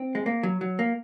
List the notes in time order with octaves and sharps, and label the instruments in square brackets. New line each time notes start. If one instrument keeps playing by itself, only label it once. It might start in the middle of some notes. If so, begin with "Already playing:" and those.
Already playing: [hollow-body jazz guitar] C4
G#3
A#3
F#3
F#3
A#3